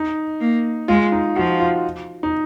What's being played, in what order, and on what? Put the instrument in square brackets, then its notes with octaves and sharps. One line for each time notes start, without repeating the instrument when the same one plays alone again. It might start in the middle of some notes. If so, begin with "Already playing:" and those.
Already playing: [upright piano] D#4
[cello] A#3
[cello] G#3 [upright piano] F4
[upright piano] D#4
[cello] F3 [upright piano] F#4
[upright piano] F4
D#4